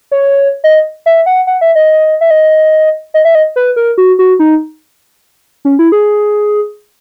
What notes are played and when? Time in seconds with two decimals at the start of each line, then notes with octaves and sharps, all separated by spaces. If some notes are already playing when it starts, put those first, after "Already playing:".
0.11 C#5
0.64 D#5
1.06 E5
1.26 F#5
1.47 F#5
1.61 E5
1.75 D#5
2.21 E5
2.31 D#5
3.14 D#5
3.25 E5
3.35 D#5
3.56 B4
3.76 A#4
3.98 F#4
4.19 F#4
4.39 D#4
5.65 C#4
5.79 E4
5.92 G#4